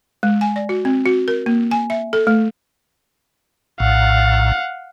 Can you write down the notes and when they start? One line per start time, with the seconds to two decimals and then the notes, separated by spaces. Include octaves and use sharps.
0.23 G#3
0.41 G#5
0.56 D5
0.69 F#4
0.85 C4
1.06 F#4
1.28 A#4
1.46 A#3
1.71 G#5
1.90 E5
2.13 A4
2.27 A3
3.80 A#1 A2 F5 F#5